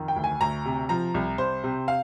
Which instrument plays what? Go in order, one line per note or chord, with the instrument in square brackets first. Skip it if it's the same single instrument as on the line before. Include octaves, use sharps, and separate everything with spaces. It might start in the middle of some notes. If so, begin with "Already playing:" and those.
Already playing: [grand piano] F2 D#3
G5
D2
G#5
D2 A#5
C3
F3 A#5
C2
C2 C5
C3
F5